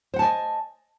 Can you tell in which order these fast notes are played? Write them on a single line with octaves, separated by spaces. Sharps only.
C5 F#5 A5 G#5 D#5